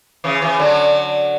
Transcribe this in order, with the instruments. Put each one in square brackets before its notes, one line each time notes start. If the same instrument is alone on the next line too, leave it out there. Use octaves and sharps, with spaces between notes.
[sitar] C#3 E3
C#3 E3
D3 F#3